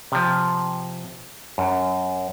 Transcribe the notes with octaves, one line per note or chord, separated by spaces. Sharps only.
C3 F3
F#2